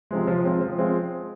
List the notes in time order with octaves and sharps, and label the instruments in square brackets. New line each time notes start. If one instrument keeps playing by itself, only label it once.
[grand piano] C3 F3 G#3
F3
G#3 C4 F4
F3
G#3 C4 F4